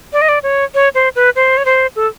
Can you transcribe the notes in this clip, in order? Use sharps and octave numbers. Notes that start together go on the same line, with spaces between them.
D5
D#5
D5
C#5
C#5
C5
B4
C5
C#5
C5
A4